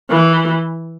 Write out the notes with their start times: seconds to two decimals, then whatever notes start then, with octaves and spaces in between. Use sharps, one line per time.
0.10 E3